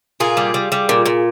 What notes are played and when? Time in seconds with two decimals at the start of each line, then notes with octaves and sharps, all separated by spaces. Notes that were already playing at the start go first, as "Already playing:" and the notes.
0.20 A#2 F4 G#4
0.37 G3
0.54 G3
0.72 G3
0.89 A#2
1.06 A#2